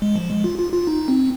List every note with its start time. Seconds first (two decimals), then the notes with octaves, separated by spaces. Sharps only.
0.02 G#3
0.16 F3
0.30 G#3
0.44 F4
0.59 F4
0.73 F4
0.87 D#4
1.08 C4